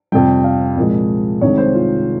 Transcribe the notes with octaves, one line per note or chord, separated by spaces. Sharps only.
F2 C3 G3 G5
F5
C2 A#2 F3 G#3
C2 C3 D#3 G#3 C#5
C5
F4